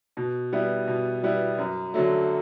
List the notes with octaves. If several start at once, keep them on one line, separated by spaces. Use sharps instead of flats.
B2
G3 B3 E4
B2
G3 B3 E4
F#2
D3 F#3 A3